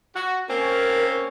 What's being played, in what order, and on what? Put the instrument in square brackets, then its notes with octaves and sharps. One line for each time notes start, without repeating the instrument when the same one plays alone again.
[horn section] F#4
[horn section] A#3 C4 C#4 [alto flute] A#4